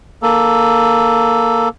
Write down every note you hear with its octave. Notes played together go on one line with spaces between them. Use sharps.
A#3 A4